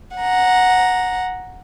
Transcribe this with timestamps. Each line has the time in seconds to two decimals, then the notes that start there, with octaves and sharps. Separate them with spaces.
0.16 F#5 A#5